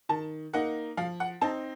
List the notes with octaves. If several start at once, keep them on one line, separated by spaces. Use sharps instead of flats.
D#3 A5
A#3 D#4 F#5
F3 F5
F#5
C4 D#4 A5